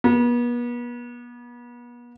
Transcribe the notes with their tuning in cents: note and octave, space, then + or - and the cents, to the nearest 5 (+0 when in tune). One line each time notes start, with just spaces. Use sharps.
B3 -40